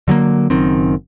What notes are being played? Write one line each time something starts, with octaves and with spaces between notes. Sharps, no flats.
D3 F#3 A3 A#3
F#1 F#2 D#3 C4